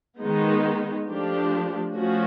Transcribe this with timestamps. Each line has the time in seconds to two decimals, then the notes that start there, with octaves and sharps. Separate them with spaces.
0.20 D#3 G#3 B3 D#4
1.07 F3 A3 D4 G4
1.93 F3 A3 C#4 F#4